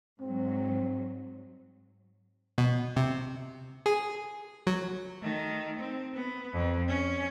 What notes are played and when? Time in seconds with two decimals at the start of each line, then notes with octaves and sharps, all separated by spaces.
0.21 G#2 F#3 C4
2.58 B2
2.96 C3
3.86 G#4
4.67 F#3
5.22 D#3 A3
5.79 C4
6.15 B3
6.54 F2
6.88 C#4